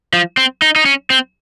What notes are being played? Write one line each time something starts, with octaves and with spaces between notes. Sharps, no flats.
F3
C4
D#4
D#4
C#4
C4